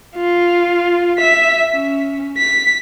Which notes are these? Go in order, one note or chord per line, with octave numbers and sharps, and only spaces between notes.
F4
E5 B6
C#4
B6